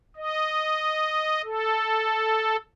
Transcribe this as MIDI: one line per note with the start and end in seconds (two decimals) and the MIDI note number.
0.16 1.42 75
1.44 2.57 69